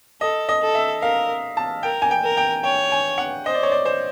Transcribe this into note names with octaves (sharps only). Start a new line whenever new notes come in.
A4 D#5
D#5
A4
E5
A#4 F5
A5
A#4 G5
G#5
G5
A#4
G5
C#5 G5
G#5
F#5
C5 D#5
D5
C#5
D5
C5